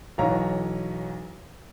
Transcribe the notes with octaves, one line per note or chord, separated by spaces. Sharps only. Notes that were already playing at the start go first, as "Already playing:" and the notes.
B1 E3 C#5 F5 A#5